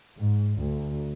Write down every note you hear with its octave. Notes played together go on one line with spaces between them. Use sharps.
G#2
D2